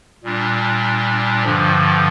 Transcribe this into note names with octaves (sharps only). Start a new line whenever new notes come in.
A#2 G3 D4
G2 D3 F3